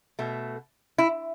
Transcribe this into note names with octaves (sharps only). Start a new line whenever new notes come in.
B2 A3
E4